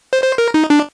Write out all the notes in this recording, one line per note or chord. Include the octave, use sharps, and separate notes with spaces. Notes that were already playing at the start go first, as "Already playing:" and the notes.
C5
C5
A#4
D#4
D4